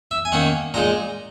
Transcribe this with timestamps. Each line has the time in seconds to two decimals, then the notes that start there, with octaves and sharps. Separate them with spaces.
0.11 E5
0.25 G#5
0.32 D#3 A#3 C#4 F#5
0.74 A#2 G#3 D#4 A#5